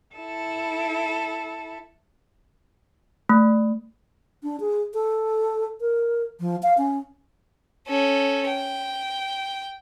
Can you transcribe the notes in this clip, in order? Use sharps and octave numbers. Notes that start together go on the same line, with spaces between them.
E4 A4
A3
D4
G#4
A4
A#4
F3
F5
C#4
C#4 A4
G5